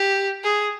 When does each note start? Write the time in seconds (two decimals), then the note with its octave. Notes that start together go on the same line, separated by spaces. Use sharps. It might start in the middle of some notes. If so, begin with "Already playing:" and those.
Already playing: G4
0.44 G#4